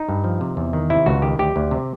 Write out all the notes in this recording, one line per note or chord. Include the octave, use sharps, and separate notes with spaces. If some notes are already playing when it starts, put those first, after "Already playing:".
Already playing: D#4
G2
F3
C3
E2
D#3
C3 E4
C#2 F#4
D#3 G4
D2 G4
D2
C3